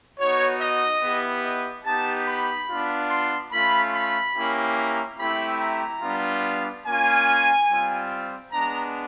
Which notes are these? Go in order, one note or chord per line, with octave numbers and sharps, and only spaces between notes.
B3 D#4 F#4 C#5
D#5
B3 E4 G4
D#5
B3 D#4 G4 A5
B5
B3 D4 F4
C6
A3 C#4 F4 B5
B5
A#3 C#4 E4 G4
A#5
A3 C4 E4 G4 B5
A#5
G3 B3 D4 F4
A#3 C#4 F4 G#5
G3 C4 F4
G#3 B3 D4 A#5